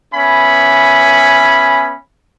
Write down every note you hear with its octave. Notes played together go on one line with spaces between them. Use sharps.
B3 C#4 E5 G#5 B5